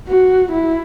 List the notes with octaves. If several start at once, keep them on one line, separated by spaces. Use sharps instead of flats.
F#4
E4